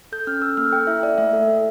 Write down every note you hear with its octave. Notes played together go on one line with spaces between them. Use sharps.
A4 G6
C#4 F6
A4 E6
A#3 F6
A4 G5
E4 E5
E4 D5
A3 E5
A4
A4